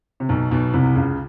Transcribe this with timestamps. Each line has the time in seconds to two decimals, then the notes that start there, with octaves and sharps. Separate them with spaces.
0.20 C3
0.29 B1 B2
0.51 B1 B2
0.74 C2 C3
0.95 C#2 C#3